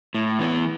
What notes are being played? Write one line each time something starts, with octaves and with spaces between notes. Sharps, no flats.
A2
E3 B3